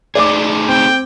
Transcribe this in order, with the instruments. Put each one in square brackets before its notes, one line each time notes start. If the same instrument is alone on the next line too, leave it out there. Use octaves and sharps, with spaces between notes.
[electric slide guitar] A3 D#4 G#4 [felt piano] D5 D6
[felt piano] C4 [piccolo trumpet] G5